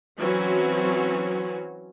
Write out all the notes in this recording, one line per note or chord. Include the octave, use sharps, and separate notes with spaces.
E3 F#3 C4 C#4 F#4